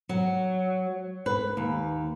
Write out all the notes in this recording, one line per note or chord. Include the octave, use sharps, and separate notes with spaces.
F#3
B4
D#2